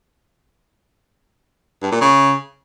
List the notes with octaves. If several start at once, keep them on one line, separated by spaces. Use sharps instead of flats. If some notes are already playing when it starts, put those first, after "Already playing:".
G2
A#2
C#3